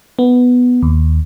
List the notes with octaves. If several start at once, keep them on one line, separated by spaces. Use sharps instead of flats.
B3
D#2